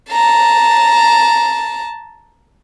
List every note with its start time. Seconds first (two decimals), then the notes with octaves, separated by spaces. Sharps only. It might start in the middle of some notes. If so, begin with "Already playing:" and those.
0.11 A5 A#5